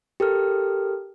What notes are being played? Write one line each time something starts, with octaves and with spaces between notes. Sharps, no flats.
G4 A4 A#4 F6